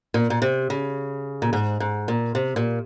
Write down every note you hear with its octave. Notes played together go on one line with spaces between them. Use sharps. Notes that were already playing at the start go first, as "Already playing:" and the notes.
A#2
A#2
C3
C#3
A#2
G#2
G#2
A#2
C3
A#2